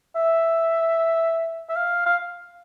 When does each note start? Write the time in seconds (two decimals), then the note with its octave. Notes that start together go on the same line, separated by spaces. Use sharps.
0.16 E5
1.69 E5
1.76 F5
2.06 F5